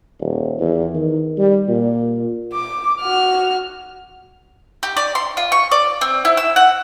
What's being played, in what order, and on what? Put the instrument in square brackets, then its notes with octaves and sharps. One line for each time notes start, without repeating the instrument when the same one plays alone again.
[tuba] D#1
E2
D#3
G3
A#2
[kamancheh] D6
F#4 F6
[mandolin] G4
D5
C6
F4
C#6
D5
C4
E4
E6
F#5